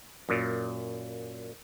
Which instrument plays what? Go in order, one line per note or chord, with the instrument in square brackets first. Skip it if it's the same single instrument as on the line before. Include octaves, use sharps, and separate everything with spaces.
[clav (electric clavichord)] F#2 A#2